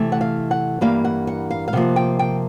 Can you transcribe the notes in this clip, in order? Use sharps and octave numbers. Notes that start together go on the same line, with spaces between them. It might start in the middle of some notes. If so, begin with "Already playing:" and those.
Already playing: C3 E3 A3
F#5
F5
F#5
G2 E3 G3 A#3 F5
F#5
F#5
F5
F5
C3 F3 A#3 F#5
G5
G5